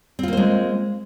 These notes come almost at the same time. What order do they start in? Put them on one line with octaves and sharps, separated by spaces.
C4 F4 A#3 C5 G#3